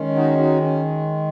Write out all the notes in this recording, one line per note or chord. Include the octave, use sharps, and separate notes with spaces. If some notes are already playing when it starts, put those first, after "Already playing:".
Already playing: D#3 G#3 C#4
D#4 F#4
D#4 F#4
C#4